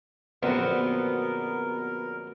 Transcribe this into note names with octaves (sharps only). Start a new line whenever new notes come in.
A#1 F#2 D3 B3 C4 F#4 A#4